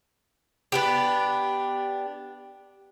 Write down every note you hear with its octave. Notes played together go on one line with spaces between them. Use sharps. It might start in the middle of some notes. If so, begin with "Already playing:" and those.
B3 D4 G4